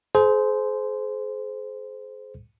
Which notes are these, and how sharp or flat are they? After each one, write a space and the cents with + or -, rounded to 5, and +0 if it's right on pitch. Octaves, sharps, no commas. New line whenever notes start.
G#4 +40 C5 -15